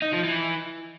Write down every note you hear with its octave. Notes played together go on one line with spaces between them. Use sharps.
D#4
F3
E3